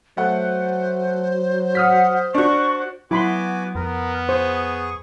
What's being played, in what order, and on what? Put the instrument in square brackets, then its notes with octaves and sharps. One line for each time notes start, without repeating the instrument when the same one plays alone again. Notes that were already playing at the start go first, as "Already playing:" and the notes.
[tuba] F#3 [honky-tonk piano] A3 F#5 [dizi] C5
[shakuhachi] F#5 [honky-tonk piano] D#6 F6 B6
[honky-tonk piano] D4 F#4 [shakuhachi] C#6
[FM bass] F#3 [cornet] B3 [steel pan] E4 B5 C6 [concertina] F#4 G#5 D6
[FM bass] F2 [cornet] B3 [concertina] A#4
[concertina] G#4 C#6 D#6 [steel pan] C5